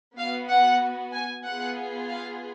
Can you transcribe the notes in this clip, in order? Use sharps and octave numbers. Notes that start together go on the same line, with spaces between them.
B3 F#4 F5
F#5
G#5
B3 F4 G#4 F#5
F5